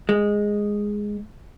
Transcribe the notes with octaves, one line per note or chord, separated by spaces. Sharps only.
G#3